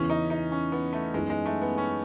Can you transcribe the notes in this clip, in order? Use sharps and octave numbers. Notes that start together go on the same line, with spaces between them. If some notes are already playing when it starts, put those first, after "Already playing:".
Already playing: E2 C#3 E3 B3 C#4 E4
D#4
D#4
C#4
B3
A3
F#2 E3 G#3 B3 D#4
G#3
A3
B3
C#4